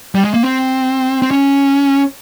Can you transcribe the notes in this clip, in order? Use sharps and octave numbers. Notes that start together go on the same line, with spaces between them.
G3
G#3
A#3
C4
C4
C#4